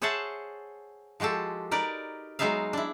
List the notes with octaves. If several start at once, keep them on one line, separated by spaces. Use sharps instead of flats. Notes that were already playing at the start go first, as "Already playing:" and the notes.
G#4 C5 C#5 E5 F#5 A5
F3 G#3 F#4 G4 A4
D#4 A#4 B4 D5
F#3 G#3 B3 D#4 E5 F5
D4 E4